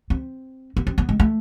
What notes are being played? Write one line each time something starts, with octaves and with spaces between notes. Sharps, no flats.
C4
B3
C4
B3
G#3
A3